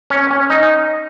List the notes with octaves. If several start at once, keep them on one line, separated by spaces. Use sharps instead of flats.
C#4
C#4
D#4